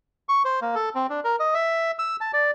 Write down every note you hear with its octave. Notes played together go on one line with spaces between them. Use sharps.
C#6
C5
A#3
A4
C4
D4
A#4
D#5
E5
E6
A5
D5